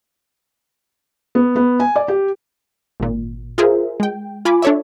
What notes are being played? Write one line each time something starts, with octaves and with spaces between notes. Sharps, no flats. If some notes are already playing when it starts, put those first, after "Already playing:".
B3
B3
G#5
D5
G4
G#1 A#2
F4 G#4 A#4 C5 E5
G#3 G5
F4 G#5 B5 D6
D4 A4 C#5 D5 E5